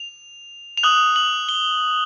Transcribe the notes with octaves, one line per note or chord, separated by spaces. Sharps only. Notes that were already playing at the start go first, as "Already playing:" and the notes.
Already playing: F7
F7
D#6 F#6 F#7
F#7
G7